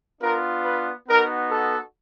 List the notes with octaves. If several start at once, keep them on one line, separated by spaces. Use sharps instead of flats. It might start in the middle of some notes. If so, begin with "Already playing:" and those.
B3 D4 F4 A#4
B4
B3 D#4 F#4 A#4
A4